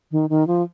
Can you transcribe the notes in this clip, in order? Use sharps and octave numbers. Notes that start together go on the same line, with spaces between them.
D#3
D#3
F3